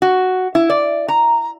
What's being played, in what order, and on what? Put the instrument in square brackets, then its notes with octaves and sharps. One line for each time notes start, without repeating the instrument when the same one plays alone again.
[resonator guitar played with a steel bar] F#4
E4
D5
A#5